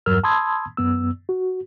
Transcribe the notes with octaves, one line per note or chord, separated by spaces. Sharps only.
E2 G2 F#3 A#4 E6 F6
A5 B5 C6 D#6 E6 G#6
F#2 B3 E6
F#4